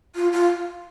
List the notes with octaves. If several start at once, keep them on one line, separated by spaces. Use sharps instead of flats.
F4
F4